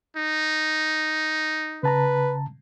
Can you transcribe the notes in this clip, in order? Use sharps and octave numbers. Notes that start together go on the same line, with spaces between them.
D#4
C#3 B4 A5 A#5